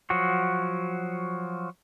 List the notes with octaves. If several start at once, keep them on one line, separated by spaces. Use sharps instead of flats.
F3 F#3 F#4